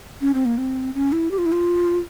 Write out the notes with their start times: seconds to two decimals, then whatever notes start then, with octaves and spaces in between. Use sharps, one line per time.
0.21 C#4
0.34 C4
0.45 A#3
0.58 C4
0.95 C#4
1.12 E4
1.31 G4
1.38 F4
1.46 E4
1.52 F4